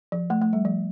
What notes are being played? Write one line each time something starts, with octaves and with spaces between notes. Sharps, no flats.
F3
A3
A3
G3
F3